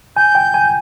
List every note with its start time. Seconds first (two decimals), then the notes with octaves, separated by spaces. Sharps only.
0.17 G#5 G6
0.35 G5
0.54 G#5